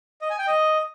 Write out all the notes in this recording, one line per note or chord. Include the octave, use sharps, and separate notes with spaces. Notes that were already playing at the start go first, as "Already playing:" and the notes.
D#5
G#5
G5
D#5